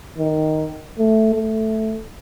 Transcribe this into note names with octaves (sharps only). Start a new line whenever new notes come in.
D#3
A3
A3